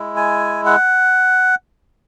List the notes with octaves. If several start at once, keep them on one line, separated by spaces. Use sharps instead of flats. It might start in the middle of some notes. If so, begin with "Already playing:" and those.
Already playing: G#3 E4
G#5
F#5